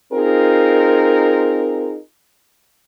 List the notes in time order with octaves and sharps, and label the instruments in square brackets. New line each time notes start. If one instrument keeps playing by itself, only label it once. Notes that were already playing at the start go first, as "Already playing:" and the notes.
[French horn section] C4 D#4 F4 G#4 A#4